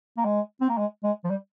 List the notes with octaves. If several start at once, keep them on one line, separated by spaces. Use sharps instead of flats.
A#3
G#3
C4
A#3
G#3
G#3
F3
G3